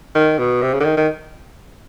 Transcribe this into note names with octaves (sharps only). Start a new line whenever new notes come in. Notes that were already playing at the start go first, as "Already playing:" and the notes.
D#3
B2
C3
C#3
D3
D#3
D#3